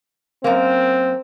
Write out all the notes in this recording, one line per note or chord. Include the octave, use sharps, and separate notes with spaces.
F#2 A#3 C4